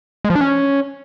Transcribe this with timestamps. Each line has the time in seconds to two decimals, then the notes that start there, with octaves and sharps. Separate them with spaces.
0.24 G#3
0.30 F3
0.35 D4
0.41 C#4